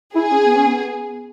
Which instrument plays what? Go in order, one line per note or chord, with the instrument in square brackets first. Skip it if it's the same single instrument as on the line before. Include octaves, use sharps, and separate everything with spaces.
[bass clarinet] E4 [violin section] G#4
[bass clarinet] C#4
B3
C#4
B3